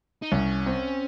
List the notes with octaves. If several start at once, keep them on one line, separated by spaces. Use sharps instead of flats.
D#4
C2 C#4
C4